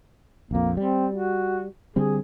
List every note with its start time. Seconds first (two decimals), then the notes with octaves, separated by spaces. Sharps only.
0.51 A#1 F2 A#3
0.77 G3 C4
1.12 F#4
1.96 D3 G3 C4 G#4